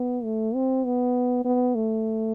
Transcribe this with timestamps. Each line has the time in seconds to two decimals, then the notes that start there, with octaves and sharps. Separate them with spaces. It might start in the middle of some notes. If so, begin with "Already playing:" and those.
Already playing: B3
0.24 A3
0.55 C4
0.85 B3
1.45 B3
1.75 A3